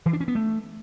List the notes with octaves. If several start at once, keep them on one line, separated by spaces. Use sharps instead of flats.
E3
D4
C#4
B3
A3